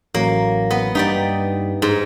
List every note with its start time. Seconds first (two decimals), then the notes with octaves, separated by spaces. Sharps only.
0.14 A1 F#3 A#3
0.71 B3
0.95 G2 D#4 G4 D5 B6
1.82 G#2